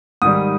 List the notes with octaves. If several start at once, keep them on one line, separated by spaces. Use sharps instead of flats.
G#2 D#3 G3 D#6